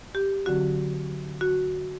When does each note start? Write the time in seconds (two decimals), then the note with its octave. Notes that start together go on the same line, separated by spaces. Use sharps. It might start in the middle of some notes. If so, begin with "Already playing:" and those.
0.15 G4
0.46 D3 F#3 C4 F#4
1.41 F#4